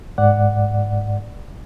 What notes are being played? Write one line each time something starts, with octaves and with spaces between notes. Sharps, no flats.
G#2 D5 F#5